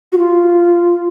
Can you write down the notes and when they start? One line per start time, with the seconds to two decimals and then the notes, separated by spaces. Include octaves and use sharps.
0.12 F#4
0.18 F4